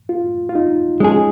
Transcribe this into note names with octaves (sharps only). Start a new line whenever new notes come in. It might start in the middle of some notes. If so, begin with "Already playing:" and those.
F4
F4
D#4
G#3 C#4 G#4